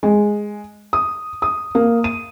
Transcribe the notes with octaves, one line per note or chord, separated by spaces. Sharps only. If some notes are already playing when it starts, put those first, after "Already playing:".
G#3
D#6
D#6
A#3
D#7